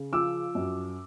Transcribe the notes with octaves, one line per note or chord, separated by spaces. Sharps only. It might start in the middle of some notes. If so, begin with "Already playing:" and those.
Already playing: C#3
F3 D6 E6
F#2